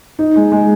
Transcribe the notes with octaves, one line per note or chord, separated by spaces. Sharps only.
D#4
G#3
G#3